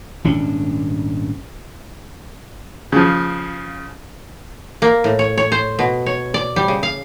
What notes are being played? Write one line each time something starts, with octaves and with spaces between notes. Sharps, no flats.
D#1 G#1 C#4 D4
C#3 F3
A#3
A2
C#5
C#5
C5
B2
C#5
D5
G3
C#3
F5